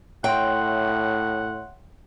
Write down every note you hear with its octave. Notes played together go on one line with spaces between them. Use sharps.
A2 C#5 E5 F#5 G5 C6